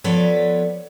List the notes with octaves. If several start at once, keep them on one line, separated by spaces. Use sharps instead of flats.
F3 B3 A4 B4 C#5 D5